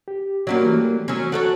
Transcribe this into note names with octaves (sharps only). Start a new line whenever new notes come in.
G4
F#3 G3 A#3 C#4 F#4 C#5
E3 A3
F#3 C#4
F#4 A4 C#5